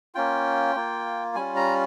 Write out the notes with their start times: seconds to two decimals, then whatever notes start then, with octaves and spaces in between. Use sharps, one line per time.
0.15 A#3 C#4 F4 G5
0.75 A#3 F4
1.35 G3 C#4 F4 G#5
1.56 A#5